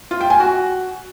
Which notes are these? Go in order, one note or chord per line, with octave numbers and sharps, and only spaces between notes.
F4
G5
G#5
F#4